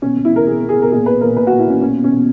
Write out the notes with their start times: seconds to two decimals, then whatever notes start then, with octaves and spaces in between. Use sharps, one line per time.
0.02 B2 C#4
0.17 B2
0.25 E4
0.31 B2 A#4
0.47 B2 G#4
0.62 B2
0.69 G#4
0.77 B2
0.82 A#4
0.92 A#2 G#4
1.06 A#2 B4
1.21 A#2 A#4
1.36 A#2 B4
1.47 A#2 F#4
1.59 E4
1.67 A#2 C#4
1.81 B2 C#4
1.96 B2
2.04 C#4
2.11 B2